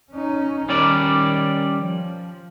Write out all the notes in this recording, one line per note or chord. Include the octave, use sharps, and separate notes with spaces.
C#4 D#4
D#3 G3 C#4 D5
F3